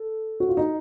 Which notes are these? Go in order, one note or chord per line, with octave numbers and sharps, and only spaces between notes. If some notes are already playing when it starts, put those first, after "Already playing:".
Already playing: A4
F#4
F4
D#4